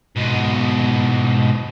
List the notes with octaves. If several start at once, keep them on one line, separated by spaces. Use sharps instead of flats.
G#2 B2